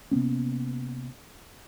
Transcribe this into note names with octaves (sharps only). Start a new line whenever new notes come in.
C3 A#3 B3 C#4